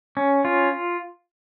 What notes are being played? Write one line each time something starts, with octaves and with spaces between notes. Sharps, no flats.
C#4
F4